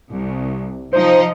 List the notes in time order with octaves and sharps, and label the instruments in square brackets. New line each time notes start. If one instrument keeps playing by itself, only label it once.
[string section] C2
[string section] F3 D#4 [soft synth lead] C5